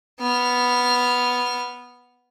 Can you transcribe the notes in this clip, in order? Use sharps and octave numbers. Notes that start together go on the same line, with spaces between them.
B3 F6